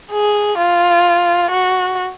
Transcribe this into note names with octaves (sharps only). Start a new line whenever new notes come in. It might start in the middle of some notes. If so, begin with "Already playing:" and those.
G#4
F4
F#4